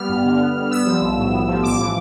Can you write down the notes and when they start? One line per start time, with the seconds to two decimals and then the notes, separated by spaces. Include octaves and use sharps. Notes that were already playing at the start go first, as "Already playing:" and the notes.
Already playing: G3 B3 F6
0.09 G2
0.25 D3
0.40 B3
0.55 G3
0.71 B3 E6
0.86 F3
1.02 B1
1.18 A2
1.32 B3
1.48 F3
1.63 A1 D6
1.79 E3